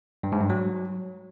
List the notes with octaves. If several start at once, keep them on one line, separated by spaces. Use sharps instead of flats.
G2
G#2
G2
F#3